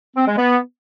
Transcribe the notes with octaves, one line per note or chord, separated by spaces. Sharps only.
C4
G#3
B3